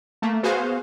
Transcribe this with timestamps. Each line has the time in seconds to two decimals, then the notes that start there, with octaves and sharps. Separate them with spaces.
0.22 A3 A#3
0.43 B3 F#4 G#4 C5 F5